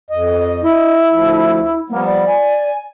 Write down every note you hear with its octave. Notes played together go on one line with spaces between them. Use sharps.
F2 D#5
E4 D#5
D2 F3
F3 G3 A#3 B3
D5
G#5